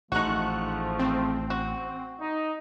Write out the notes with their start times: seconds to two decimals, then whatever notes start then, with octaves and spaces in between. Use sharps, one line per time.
0.12 A1 G#2 F3 A3 D#4 F#4 C#6 F#6
0.99 C4
1.50 F#4
2.21 D#4